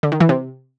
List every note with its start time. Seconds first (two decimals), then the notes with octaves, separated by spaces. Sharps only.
0.03 D3
0.12 D#3
0.20 E3
0.29 C3